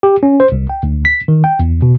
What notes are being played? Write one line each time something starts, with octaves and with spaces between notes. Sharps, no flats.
G4
C#4
C5
C2
G5
D2
B6
D#3
G5
E2
B2